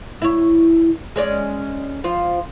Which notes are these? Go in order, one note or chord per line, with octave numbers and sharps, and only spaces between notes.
E4 C#5
G#3 C#4 D5
F3 F4